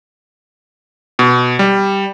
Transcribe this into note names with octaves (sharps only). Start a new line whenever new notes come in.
B2
G3